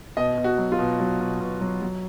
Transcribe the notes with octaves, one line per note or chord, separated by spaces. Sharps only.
B2 D#5
B2
F#4
F#3
F4
B2
F#3
B2
B2
F#3
F#3